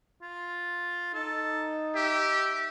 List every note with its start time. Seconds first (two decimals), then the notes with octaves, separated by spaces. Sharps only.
0.22 F4
1.14 D#4 A4
1.96 G4 E5